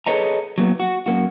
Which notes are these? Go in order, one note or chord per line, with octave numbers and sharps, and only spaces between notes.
G#4 A4 B4 C#5 D#5 A#5
F#3 A#3 B3
F#4
F#2 A#3 F#4